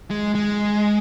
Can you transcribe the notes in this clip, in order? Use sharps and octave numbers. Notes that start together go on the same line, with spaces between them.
G#3
G#3